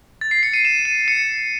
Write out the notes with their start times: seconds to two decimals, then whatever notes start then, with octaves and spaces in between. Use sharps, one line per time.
0.21 A6
0.31 C7
0.43 C#7
0.54 D#7
0.65 E7
0.85 D#7
1.08 C#7